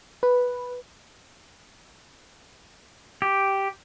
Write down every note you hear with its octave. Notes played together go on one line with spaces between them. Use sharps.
B4
G4